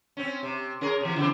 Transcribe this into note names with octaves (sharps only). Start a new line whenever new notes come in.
C4 C#4
C3
C#4 G#4 A#4
C3 E3
C#3 E3 C4